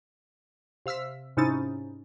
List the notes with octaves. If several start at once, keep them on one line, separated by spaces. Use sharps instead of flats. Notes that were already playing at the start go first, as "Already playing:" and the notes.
C3 F5 E6 F6 B6
G#2 C3 C#4 D#4 E4 A6